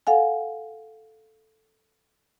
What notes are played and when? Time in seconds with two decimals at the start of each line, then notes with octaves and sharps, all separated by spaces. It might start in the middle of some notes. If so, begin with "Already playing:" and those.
0.07 A4 F5 F#5 G#5